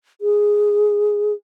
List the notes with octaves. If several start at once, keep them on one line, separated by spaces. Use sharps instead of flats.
G#4